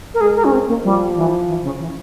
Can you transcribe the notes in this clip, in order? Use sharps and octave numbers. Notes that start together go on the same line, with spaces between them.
A#4
G#3 G#4
A#4
C#4
C4
A#3
F3 G3
E3
E3
C#3
E3